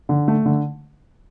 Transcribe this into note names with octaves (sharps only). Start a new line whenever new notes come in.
D3
A3
D3